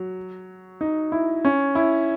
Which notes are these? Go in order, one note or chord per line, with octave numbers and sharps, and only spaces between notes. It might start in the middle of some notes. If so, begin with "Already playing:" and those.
Already playing: F#3
D#4
E4
C#4
E4